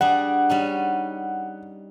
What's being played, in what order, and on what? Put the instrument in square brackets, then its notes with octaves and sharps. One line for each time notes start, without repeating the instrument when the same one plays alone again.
[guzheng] G3 D4 G#4 [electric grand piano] F#5
[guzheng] G3 C#4 D#4